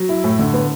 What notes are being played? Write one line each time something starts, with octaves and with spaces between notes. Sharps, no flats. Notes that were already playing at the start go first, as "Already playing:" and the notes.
Already playing: F#3
E4
A2
D3
B3